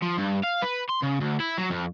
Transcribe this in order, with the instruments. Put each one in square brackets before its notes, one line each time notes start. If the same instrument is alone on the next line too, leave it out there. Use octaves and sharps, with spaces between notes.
[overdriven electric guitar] F3
G2
F5
B4
C6
C#3
D2
E4
F#3
F2